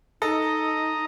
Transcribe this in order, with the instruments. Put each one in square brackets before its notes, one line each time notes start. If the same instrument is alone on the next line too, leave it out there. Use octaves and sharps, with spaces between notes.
[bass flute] D#4 [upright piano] A4 [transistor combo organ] D#5 A#5